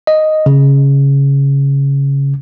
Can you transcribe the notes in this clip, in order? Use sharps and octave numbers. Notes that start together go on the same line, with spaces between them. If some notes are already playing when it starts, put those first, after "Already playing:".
D#5
C#3